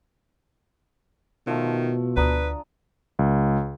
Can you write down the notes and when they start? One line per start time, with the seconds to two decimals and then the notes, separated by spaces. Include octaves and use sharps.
1.47 B2 D#3 F3 A3
2.17 D2 D4 B4 A#5 D#6
3.19 C#2